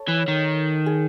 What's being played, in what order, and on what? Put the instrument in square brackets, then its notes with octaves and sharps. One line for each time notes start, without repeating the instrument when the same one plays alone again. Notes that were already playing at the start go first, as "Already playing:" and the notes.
Already playing: [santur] A4 C#5
[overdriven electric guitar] E3
D#3
[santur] G#4